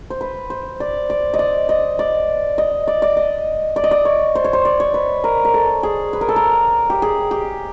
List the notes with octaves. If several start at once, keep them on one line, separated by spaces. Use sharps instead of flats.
C5
B4
C5
D5
D5
D#5
D5
D#5
D5
D#5
D5
D5
D#5
D5
D#5
D5
C#5
C5
C#5
C5
D5
C#5
B4
A#4
A#4
A4
G#4
B4
A#4
A4
A#4
G4
G#4
G4